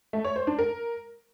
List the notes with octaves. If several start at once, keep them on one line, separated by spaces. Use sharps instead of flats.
A3
C#5
C5
D4
A#4